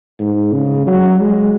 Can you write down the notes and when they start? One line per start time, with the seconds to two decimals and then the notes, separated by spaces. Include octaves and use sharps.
0.20 G#2
0.53 C#3
0.87 F#3
1.21 G#3